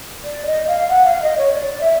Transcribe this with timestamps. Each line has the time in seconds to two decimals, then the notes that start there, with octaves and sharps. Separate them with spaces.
0.24 D5
0.46 D#5
0.67 F5
0.89 F#5
1.05 F5
1.22 D#5
1.38 C#5
1.54 D5
1.81 E5